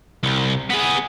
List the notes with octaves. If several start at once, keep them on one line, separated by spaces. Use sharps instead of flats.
C2
B3 G#4